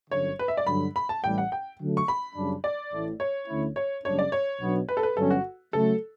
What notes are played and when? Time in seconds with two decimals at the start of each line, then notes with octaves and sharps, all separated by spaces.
0.10 G1 F#2 D3 C#5
0.39 B4
0.48 E5
0.57 D5
0.67 G2 D3 F#3 B5
0.96 B5
1.09 A5
1.24 A1 A2 G3 G5
1.38 F#5
1.52 G5
1.80 D3 F#3 A3
1.97 C#6
2.08 B5
2.35 F#2 C#3 G3 D4
2.64 D5
2.92 A1 A2 E3 A3 E4
3.20 C#5
3.48 D2 D3 A3 C#4 E4
3.76 C#5
4.05 F#1 F#2 C#3 G3 D4 C#5
4.19 D5
4.32 C#5
4.60 B1 B2 F#3 B3 D4
4.89 B4
4.97 A4
5.03 B4
5.17 G1 G2 F#3 C#4 A4
5.30 F#4
5.73 C#3 F#3 A3 A4